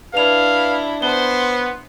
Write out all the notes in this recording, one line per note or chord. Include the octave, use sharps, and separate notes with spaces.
D4 E4 B4 F5 F7
B3 C5 C6 G7